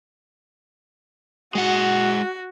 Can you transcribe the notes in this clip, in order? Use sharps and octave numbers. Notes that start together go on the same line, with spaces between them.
G#3 F#4 F#5